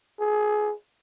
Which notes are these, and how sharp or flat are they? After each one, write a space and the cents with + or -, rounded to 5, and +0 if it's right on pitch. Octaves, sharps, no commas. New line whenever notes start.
G#4 +25